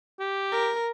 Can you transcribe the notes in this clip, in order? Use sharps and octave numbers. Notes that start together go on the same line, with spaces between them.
G4
A#4